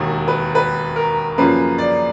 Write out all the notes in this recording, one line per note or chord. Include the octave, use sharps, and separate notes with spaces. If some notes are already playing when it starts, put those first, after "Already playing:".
Already playing: E1 D#2 D#3
B4
B4
A#4
F#2 C#3 F3 A#3 B4
D5